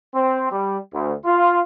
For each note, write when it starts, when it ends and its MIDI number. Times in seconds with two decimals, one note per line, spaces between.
0.14 0.46 60
0.51 0.78 55
0.94 1.13 38
1.25 1.60 65